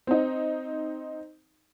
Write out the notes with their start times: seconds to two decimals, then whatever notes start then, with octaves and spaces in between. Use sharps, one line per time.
0.07 C4 D#4